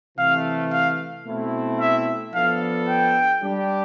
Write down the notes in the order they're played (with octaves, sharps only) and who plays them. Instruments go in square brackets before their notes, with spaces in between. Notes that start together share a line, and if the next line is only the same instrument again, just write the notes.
[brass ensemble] C3 E3 A3 [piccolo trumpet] F5
[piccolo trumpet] F5
[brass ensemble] B2 A3 C4 E4
[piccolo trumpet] E5
[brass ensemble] F3 B3 D4 A4 [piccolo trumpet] F5
[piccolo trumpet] G5
[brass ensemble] G3 D4 G4